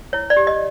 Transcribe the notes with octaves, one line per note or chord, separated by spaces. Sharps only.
E4 C#5
D5
G4
D#5